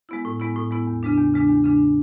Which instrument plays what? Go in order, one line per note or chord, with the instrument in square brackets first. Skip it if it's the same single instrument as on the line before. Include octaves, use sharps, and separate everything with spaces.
[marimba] G#3 B3 E4
A2
G#3 B3 E4
A2
G#3 B3 E4
E2
C#3 G#3 D4
E2
C#3 G#3 D4
E2
C#3 G#3 D4